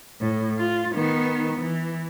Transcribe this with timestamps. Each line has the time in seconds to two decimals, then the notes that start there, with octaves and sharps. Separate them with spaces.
0.21 A2
0.58 F4
0.94 D#3 B3
1.60 E3